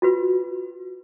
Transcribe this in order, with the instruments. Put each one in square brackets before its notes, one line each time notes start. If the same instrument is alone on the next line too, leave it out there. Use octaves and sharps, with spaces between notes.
[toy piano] F4 F#4 B4